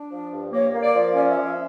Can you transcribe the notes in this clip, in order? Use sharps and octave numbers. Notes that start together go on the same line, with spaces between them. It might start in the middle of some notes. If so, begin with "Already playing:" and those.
Already playing: D4
F3
G2
A#3 C#5
A#3
D5
F3
C#4 D5
E5
F3
E5